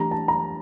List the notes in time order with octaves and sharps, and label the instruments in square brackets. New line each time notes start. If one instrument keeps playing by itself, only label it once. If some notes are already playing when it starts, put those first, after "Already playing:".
Already playing: [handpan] E3 A3 D4 G4 [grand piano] A#5
[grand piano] A5
A#5